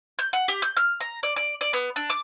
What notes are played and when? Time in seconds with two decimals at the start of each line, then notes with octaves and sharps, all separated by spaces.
0.19 G6
0.33 F#5
0.48 G4
0.62 G6
0.77 F6
1.01 A#5
1.23 D5
1.36 D5
1.61 D5
1.73 B3
1.96 D4
2.10 D6